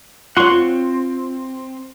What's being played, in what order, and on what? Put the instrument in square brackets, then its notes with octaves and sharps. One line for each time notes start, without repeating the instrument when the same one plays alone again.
[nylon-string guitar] F4 C#5 [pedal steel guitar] F#5 C6 C#6
[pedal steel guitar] C4